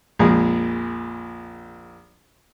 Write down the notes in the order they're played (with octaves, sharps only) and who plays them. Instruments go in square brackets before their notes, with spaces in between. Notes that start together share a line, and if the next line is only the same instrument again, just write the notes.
[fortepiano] A#1 F2 A#2 G#3 G#4